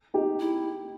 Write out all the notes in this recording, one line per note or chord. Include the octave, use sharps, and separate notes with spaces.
D#4 G4
E4